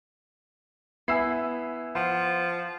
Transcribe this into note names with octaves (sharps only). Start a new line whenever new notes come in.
B3 E4 G#5 E6 C7
F3 F#5 C6